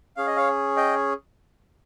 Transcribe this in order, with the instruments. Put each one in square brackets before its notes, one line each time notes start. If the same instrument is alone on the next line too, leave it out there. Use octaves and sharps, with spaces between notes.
[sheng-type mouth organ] C#4 G#4 F5
D#5
C#5 F5
D#5 G5